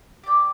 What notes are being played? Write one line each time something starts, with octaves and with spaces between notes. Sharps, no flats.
G4 D5 G5